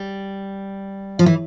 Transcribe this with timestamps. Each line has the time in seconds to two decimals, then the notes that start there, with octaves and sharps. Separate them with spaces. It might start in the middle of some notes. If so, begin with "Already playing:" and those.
Already playing: G3
1.19 F3
1.26 E3